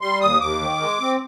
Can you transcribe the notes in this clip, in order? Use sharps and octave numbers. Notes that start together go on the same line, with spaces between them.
G3 C6
D#2 D#6
D#2 D6
D#3
G#3
C4